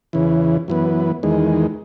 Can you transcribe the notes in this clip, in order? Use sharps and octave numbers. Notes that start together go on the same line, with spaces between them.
E2 C#3 E3
F#2 E3 B3
E2 D#3 G#3